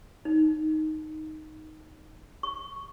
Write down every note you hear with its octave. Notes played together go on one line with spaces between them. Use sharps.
D#4
C#6